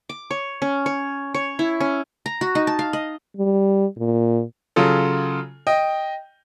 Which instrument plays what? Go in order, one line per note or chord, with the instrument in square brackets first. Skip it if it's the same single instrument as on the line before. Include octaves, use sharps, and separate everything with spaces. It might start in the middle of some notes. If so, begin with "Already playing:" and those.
[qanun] D6
C#5
C#4
C#5
C#5
E4
C#4
A#5
F#4
D#4
A5
F5
D#5
[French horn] G3
A#2
[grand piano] C#3 F#3 F4 A4
D#5 G5